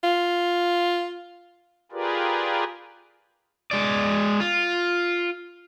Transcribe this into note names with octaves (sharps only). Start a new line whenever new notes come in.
F4
F4 G4 G#4 A#4 B4 D5
G#3 D5
F4